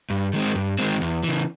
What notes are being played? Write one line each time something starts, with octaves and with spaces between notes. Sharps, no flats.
G2
D#3 G#3 C4
G2
D#3 G#3 C4
E2
C#3 E3